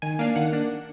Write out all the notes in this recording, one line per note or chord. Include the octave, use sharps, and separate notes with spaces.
D#3 G#5
A#3 D4 F5
D#3 F#5
A#3 D4